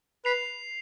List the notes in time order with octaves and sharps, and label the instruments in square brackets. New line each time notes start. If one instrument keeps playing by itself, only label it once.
[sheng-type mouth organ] B4 [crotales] C7 F7